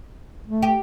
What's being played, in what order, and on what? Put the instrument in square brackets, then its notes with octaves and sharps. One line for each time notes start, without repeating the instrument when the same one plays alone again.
[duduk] A3
[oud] G4